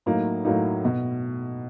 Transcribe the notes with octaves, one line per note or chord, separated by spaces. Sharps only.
A2 F#3 A#3 D#4
A2 F#3 A#3 D#4
B2